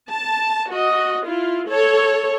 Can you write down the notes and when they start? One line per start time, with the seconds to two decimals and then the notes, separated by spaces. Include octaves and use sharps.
0.10 A5
0.73 F#4 D#5
1.24 E4 F4
1.68 A4 C#5